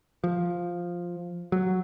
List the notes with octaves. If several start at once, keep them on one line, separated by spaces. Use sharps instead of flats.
F3
F#3